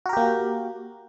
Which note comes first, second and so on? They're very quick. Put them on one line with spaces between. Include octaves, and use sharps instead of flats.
F#4 A#4 G4 A#3